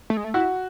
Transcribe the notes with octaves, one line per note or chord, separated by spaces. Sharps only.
A3
G#3
A3
E4 F#4